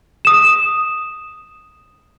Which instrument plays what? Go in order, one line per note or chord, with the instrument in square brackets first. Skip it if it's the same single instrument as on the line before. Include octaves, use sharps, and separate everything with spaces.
[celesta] D#6 E7